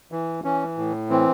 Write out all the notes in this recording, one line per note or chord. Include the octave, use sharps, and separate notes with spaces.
E3
E3 C#4
A2
E3 C4